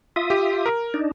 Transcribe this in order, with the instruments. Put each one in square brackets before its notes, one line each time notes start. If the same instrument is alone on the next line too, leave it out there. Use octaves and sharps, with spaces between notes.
[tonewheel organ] F4 E5 D#6
[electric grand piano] G4
A#4
[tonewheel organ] D4 D#4